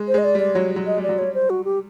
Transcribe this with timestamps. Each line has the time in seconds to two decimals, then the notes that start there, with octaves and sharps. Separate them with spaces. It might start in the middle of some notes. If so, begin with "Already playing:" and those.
Already playing: G#3
0.08 C5
0.14 G#3 D#5
0.24 D5
0.35 G3 D5
0.55 F#3 C#5
0.76 F#3
0.87 D#5
0.98 G3 D5
1.09 F#3
1.18 G3 C#5
1.34 C5
1.50 F#4
1.65 G4